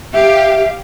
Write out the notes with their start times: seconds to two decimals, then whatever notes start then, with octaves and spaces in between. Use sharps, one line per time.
0.14 G4 E5 F5